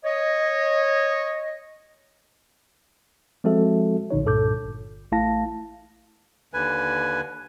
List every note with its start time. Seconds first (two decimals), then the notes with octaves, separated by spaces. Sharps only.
0.04 C#5 D#5
3.44 F3 G#3 C4 F#4 A4 E5
4.10 A#1 D3 D#4 C#5
4.24 C2 G2 A#2 A4 D6 G6
4.64 G1
5.12 A1 A3 E4 F5 A5 A#6
6.54 D#2 D3 B4 G#5